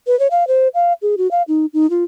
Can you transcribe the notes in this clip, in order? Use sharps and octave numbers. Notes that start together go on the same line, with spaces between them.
B4
C#5
F5
C5
F5
G#4
F#4
F5
D#4
D#4
F4